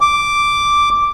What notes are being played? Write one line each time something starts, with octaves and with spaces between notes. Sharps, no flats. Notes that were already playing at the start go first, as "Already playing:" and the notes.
D6